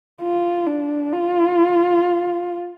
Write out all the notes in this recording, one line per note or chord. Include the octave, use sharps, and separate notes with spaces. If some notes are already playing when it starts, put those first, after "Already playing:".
F4
D4
F4